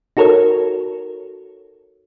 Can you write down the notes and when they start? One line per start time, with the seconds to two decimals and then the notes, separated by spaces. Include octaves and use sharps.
0.17 D#4 F#4 A4 A#4 C#5